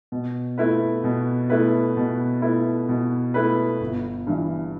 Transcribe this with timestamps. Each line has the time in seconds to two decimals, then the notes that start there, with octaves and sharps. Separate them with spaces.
0.12 B2
0.58 A3 E4 B4
1.04 B2
1.50 A3 E4 B4
1.97 B2
2.42 A3 E4 B4
2.89 B2
3.34 A3 E4 B4
3.80 G1
4.27 G2 E3